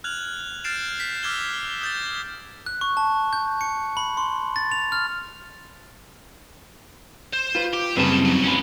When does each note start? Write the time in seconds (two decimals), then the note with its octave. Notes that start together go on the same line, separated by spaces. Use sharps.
0.04 F6 F#6 G#6 F7 F#7
0.64 F6 G6 A6 C7 D7 E7
1.00 G6 B6
1.23 D6 E6 F6 G#6 E7 G7
1.81 D#6 G6 A6
2.66 F#6
2.81 C#6
2.97 A5
3.33 G6
3.61 C#7
3.97 B5
4.17 C6
4.56 A6
4.72 F7
4.92 F6
7.33 C5
7.55 F4 B4
7.73 G4
7.97 F#2 C#3 G3 C4 E4 B4 A5
8.25 F2 F#3
8.44 C#4 B4